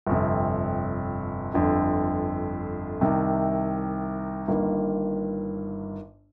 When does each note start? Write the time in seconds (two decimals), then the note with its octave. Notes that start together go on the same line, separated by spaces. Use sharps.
0.07 G1 F2 C3
1.54 G1 F2 D3
3.01 C2 C3 D#3
4.48 G1 G2 D#3 A#3